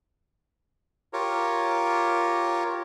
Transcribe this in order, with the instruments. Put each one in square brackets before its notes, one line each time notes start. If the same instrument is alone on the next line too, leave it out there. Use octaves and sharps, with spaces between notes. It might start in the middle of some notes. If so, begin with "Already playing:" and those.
[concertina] F4 G4 A#4 C#5